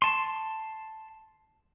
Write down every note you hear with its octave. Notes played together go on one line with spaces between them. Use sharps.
A5 C6